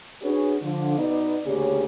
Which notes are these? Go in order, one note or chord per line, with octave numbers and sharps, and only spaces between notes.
C#4 D4 F#4 G#4 B4 C#5
D3 F3
B2 B3 D#4 D5
D2 A#2 C#3 C#4 G4 D5